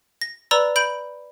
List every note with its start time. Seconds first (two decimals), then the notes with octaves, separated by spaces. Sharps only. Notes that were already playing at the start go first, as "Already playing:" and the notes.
0.22 A#6
0.51 B4 D5 A#5 B5 E6
0.76 B5 G6 D7 F#7